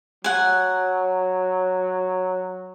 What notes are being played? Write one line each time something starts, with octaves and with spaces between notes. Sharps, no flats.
F#3 F#5 G#5